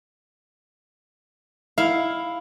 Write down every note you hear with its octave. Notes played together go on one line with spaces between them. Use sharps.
E4 F5